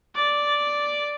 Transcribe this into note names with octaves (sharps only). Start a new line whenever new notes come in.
D5